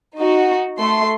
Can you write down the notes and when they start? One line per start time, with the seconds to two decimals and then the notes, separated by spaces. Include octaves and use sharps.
0.19 D#4 F#4
0.77 A3 C6